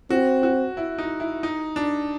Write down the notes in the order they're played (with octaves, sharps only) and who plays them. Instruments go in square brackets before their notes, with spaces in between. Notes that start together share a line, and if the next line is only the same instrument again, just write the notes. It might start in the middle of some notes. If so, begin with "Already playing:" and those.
[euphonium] C4 [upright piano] F#4
[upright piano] F#4
E4
D#4
E4
D#4
D4